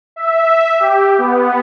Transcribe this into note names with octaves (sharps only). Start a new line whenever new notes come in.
E5
G4
B3